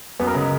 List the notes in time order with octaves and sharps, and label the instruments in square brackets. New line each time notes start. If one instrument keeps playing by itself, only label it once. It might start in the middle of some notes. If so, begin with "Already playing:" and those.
[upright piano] F#2 B3
A#4
C#3 G#3